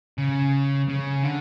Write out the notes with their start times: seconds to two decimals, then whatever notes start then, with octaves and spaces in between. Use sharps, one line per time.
0.18 C#3
0.89 C#3
1.24 D3